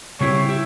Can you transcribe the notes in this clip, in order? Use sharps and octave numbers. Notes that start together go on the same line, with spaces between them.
C#3 G3 C4 E4 G4 C#5
E4 G4